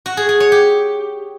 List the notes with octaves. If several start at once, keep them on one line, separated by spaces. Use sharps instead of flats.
F#4
G#4
G#4
C#5
G4